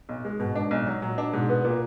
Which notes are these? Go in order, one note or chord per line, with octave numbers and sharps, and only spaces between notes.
B1
G#3
G#2 B2
D4
B1
F#3
A#2 F#3
D4
G#2 B2
B3
A#2